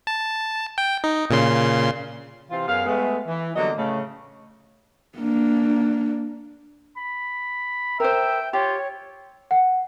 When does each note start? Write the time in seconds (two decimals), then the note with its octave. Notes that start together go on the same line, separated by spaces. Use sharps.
0.07 A5
0.78 G5
1.04 D#4
1.30 A#2 C#3 C6
2.51 C3 E3 C4 F4
2.67 F#2 B3 G#4 F5
2.86 G#3 A3 B3
3.28 E3
3.56 D3 F#3 G3 A#3 B3 D#5
3.78 A2 C#3 A3
5.18 A#3 D4
6.97 B5
8.00 A#4 C5 E5 G5
8.53 F4 G4 C#5
9.51 F#5